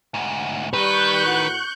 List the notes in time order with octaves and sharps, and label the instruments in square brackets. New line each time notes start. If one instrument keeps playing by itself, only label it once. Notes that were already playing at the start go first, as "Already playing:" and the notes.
[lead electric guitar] D2 G#2
[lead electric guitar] D#3 [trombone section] G3 [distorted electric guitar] B4 [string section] C#6 F#6 G6
[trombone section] A2 F#4